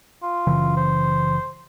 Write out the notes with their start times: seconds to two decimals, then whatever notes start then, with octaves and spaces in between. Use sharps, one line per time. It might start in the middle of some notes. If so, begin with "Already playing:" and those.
0.23 F4
0.47 F#1 C#3 E3
0.77 C5